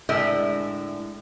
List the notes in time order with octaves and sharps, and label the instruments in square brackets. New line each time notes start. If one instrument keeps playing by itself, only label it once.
[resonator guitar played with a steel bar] A2 D3 G#3 A#4 E5